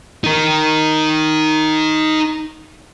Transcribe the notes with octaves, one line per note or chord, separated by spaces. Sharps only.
D#4 A#4